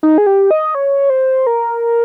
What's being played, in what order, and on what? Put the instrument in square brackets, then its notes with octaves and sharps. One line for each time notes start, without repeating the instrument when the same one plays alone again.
[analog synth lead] D#4
G#4
G4
D#5
C#5
C5
A#4